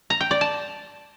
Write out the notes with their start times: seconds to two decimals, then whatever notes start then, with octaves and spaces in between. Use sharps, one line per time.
0.10 A#5
0.21 G5
0.31 D5
0.41 A5